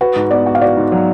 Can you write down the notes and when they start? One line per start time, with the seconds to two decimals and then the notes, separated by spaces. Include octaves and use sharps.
0.01 F#4 B4
0.16 G#2
0.31 B3 D5
0.46 F#4
0.55 F5
0.61 F#4 D5
0.77 G#2
0.92 F#3